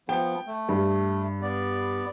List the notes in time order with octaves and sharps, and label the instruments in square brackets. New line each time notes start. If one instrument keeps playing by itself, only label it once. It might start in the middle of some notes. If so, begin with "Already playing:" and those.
[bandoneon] F3 B3 [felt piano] G5
[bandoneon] A3
[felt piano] G2
[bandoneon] B3 D5